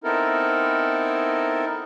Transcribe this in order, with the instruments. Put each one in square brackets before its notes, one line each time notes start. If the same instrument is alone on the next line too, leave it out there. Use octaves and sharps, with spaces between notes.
[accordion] B3 C4 D#4 E4 A4 A#4